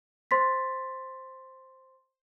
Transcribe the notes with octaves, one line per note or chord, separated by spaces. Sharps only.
C5 C6 A6 B6